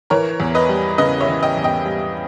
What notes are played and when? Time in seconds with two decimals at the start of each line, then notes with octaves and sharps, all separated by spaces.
0.10 E3 A#4 C#5
0.40 E2
0.55 B4 D#5
0.69 G3
0.98 C#3 B4 D#5
1.21 C#5 E5
1.28 E3
1.43 D#5 G5
1.57 E2
1.64 D#5 G5
1.86 G3